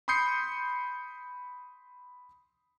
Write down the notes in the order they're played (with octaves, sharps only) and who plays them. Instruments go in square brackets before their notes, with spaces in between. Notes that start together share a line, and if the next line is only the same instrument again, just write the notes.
[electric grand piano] B5 C6 D#6 G6 C7 C#7